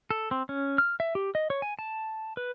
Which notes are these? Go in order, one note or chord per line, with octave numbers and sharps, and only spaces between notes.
A4
C4
C#4
F6
E5
G4
D#5
C#5
G#5
A5
B4